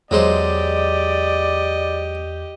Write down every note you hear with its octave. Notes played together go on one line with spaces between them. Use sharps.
E2 F#3 G#3 G4 C5 D5 D#5